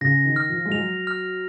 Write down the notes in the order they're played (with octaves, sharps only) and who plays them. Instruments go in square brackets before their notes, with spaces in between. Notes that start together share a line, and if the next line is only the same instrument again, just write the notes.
[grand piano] C#3 [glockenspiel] A#6
[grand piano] D#3
[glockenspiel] F6
[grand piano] F3
G#3
[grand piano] F#3 [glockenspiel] F7
[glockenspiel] F6